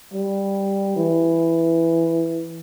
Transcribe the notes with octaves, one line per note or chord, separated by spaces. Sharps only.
G3
E3